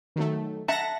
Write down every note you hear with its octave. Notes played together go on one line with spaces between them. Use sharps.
D#3 F#3 A3
E5 F#5 A5 A#6